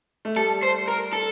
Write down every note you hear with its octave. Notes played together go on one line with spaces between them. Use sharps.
A3
G3 A4
C5
A#4
A4